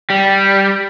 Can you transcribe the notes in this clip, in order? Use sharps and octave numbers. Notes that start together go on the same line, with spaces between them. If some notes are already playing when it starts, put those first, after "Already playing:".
G3